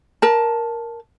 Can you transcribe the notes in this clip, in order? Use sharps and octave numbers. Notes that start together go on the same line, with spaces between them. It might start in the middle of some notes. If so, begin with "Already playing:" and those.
A#4 A5